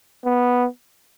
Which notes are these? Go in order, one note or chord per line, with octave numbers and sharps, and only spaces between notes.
B3